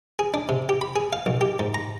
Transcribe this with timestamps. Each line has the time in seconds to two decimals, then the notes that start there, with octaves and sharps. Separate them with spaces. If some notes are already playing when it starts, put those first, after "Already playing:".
0.19 G#4
0.34 D4
0.49 C3
0.69 G4
0.81 B5
0.96 G#4
1.13 F5
1.26 B1
1.41 G4
1.59 G#2
1.74 A#5